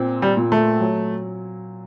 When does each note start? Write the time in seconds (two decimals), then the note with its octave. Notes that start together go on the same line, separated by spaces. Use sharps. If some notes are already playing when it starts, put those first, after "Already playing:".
Already playing: A#2 C4
0.22 G3
0.37 A#2
0.52 A3
0.80 F#3